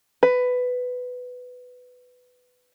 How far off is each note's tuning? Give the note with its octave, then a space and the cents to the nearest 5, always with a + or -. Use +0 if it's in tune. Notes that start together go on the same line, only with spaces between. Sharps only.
B4 +10